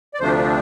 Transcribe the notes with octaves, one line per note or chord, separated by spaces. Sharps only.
D5
D2 C3 F3 A3 D4 C5